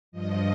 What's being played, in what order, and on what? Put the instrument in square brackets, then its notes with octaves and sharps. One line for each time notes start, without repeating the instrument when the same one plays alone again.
[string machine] G2 F3 D#5